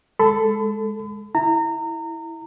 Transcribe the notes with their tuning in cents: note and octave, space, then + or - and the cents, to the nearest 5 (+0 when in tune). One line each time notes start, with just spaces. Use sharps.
G#3 +0 A4 +0 B5 +40
E4 -5 A#5 -30